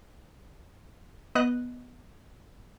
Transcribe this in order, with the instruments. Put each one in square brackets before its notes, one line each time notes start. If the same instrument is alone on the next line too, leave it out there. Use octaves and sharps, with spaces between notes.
[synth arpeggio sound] B3 D#5 F#6